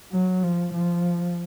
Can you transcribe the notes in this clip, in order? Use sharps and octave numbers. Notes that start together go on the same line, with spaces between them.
F#3
F3
F3